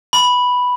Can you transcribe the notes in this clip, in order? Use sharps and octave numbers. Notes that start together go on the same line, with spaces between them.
B5